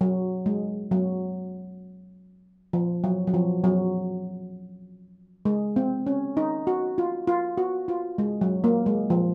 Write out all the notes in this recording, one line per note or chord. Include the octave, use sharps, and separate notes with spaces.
F#3
G#3
F#3
F3
F#3
F#3
F3
F#3
G#3
C4
C#4
D#4
F#4
F4
F4
F#4
F4
G#3
F#3
A#3
G#3
F3